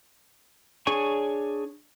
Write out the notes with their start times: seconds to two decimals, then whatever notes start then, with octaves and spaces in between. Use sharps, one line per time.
0.87 D4 G#4 C#5 G#5 C#6